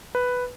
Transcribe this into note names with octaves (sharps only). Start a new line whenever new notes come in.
B4